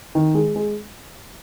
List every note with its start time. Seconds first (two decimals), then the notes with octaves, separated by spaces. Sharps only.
0.15 D#3
0.35 G#3
0.56 G#3